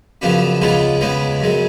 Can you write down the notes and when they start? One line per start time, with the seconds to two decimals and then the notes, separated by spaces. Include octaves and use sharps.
0.21 F#2 C#3 F3 B3 D4
0.62 C#2 C#3 G#3 B3 F4
1.01 C#2 C#3 G#3 B3
1.40 F#2 C#3 G#3